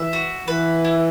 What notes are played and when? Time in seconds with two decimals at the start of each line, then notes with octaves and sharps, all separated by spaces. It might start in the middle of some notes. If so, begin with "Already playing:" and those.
Already playing: E3 B4 E5
0.13 F#4
0.48 E3 B4
0.85 E4